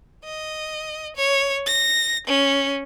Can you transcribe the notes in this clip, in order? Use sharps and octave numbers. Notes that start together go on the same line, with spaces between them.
D#5
C#5
A#6
C#4